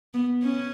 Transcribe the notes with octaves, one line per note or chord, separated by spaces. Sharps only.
B3
C#4